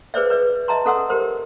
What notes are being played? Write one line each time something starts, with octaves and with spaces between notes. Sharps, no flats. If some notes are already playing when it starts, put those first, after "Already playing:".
G#4 B4 C5 D5 E5
B4 D5 E5
D#5 E5 A5 A#5 C6
C#4 A4 F#5 C6 E6
G4 A#4 C5